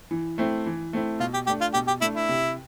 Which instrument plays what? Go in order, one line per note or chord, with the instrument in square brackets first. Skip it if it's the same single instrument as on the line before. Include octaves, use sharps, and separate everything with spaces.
[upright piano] E3
A3 C4 E4
E3
A3 C4 E4
[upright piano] B2 [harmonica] F4
[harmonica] G4
[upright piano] A3 D4 [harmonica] G4
[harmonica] F4
[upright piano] B2 [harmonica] G4
[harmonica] G4
[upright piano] A3 D4 [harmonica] E4
[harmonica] E4
[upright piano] C3